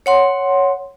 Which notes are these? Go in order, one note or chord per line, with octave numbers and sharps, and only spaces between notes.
C#5 F#5 C6